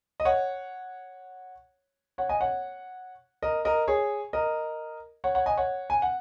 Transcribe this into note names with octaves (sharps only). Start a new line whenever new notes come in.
D#5
C#5 F#5
C#5 F#5
D#5 G#5
C#5 F#5
A#4 D#5
A#4 D#5
G#4 C#5
A#4 D#5
C#5 F#5
C#5 F#5
D#5 G#5
C#5 F#5
G#5
F#5